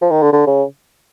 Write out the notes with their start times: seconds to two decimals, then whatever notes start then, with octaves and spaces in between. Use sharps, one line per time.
0.02 F3
0.11 D#3
0.23 D3
0.33 D3
0.47 C#3